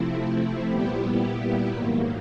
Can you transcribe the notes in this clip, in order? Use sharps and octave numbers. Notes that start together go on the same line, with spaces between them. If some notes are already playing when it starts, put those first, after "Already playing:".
Already playing: C3 F3 A3 C4 E4
A#2 G3 B3 E4 G4
G#2 D#3 F#3 A#3